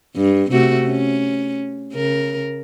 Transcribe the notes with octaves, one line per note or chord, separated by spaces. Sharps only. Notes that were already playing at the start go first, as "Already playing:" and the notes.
G2
C3 A3 F#4
C#4
C#3 A#4